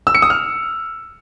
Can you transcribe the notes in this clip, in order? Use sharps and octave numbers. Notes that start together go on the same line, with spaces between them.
E6
C#7
D#6
F6